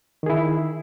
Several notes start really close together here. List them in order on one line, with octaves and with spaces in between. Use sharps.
D#3 G#4 E4